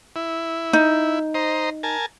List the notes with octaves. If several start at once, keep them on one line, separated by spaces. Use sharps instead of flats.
E4
D#4
C5 D#5 A#5
A#4 G#5 A5